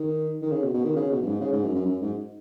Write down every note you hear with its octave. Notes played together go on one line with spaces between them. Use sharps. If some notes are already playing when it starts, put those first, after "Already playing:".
Already playing: D#3
D#3
C#3
B2
B2
D#3
C#3
B2
F#2
G#2
C#3
G#2
F#2
F#2
F#2
G#2